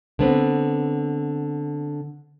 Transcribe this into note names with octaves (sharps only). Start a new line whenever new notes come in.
D3 B3 C4